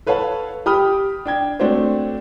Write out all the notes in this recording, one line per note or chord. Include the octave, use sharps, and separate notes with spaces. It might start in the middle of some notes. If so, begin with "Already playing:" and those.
A4 B4 C#5 F5 F#5 A5
G4 G5 B5 D#6 F6
D4 G5 G#6
A3 C4 D4 F#4 C5 C#5